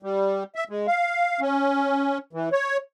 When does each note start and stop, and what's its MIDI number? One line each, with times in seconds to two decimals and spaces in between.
0.03 0.44 55
0.56 0.64 76
0.69 0.87 56
0.88 1.40 77
1.41 2.18 61
2.33 2.49 52
2.53 2.77 73